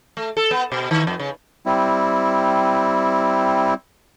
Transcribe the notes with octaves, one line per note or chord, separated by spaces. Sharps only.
A3
A4
B3
B2
D#3
F2
C#3
G3 C4 E4